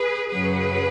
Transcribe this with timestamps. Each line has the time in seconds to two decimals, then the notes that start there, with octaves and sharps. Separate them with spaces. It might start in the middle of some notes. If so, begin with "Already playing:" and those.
Already playing: G#4 B4
0.31 F#2 C#3 F#3 G#4 B4